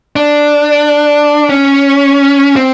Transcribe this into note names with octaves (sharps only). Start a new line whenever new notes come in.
D4
C#4
C4